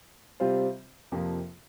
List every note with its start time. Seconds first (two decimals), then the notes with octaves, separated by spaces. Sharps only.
0.40 C3 G3 C4 F4 C5
1.12 F2 C3 F3 A#3